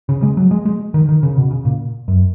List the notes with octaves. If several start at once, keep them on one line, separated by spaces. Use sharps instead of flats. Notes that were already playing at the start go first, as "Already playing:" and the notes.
C#3
G#3
F#3
G#3
G#3
D#3
D#3
C#3
B2
C#3
A#2
F#2